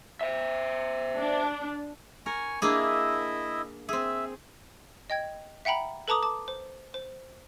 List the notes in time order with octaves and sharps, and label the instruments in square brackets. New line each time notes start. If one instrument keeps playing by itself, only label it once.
[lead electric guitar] C5 E5
[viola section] D4
[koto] A#4 [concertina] G#5 C#6
[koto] A#3 D4 G#4 [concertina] E4 D#5 E5
[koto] C4 G#4 [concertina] E5
[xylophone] D#5 G5 G#6
E5 F#5 G5 A#5 B5
A4 B4 A5 A#5 D6 D#6
A5 D6
C5
C5